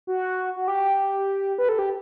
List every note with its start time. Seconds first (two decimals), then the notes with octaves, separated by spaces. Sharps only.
0.07 F#4
0.56 F#4
0.68 G4
1.58 B4
1.69 A4
1.79 G4